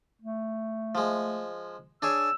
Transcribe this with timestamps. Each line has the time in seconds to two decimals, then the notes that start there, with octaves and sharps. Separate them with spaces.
0.22 A3
0.95 F3 G#3
2.02 D4 G#4 C#5 E6